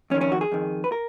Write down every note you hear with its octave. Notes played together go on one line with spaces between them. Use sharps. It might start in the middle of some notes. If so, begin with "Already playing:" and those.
F2 D#3 C#4
C#4
F#4
G#4
F2 D#3
B4
A#4